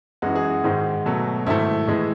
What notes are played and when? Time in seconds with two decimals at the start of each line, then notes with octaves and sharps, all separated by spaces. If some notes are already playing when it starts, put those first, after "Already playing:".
0.22 F#2 E3 G#3 F#4
0.35 G#4
0.50 F#4
0.64 G#2 D#3 G#3
1.06 B2 F#3 A3
1.47 G#2 D#3 A3 E4
1.87 A2 E3 G#3